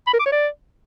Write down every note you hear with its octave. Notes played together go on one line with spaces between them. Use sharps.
B5
A#4
D6
C#5
D5